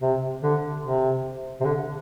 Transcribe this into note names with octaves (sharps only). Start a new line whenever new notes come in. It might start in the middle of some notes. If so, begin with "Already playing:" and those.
C3
D3
C3
C3
D3